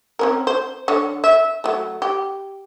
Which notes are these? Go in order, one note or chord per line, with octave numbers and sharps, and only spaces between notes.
C4 C#4 A#4
C5
D3 C#5
E5
F#3 A3
G4